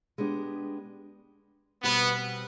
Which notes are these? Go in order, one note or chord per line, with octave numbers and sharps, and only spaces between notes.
G#3 B3 D4 G4
B2 G3 B3 C4